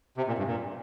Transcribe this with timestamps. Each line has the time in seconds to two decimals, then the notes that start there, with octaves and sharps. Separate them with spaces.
0.17 C3
0.27 A#2
0.38 G2
0.47 A#2